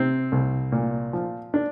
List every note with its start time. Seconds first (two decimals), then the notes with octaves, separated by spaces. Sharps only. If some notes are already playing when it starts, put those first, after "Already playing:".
Already playing: C3 C4
0.32 C2
0.72 A#2
1.13 F3
1.54 D4